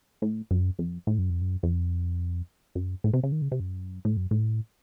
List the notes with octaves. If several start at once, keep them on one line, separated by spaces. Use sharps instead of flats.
A2
F#2
F2
A2
F#2
F2
F#2
F2
F#2
A2
C3
C#3
D#3
C#3
C3
F#2
A2
F#2
A2